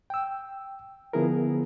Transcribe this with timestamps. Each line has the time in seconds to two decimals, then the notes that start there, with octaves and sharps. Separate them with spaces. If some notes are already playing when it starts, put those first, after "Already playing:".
0.10 G5 E6
1.13 D3 F3 B3 E4 G#4 A#4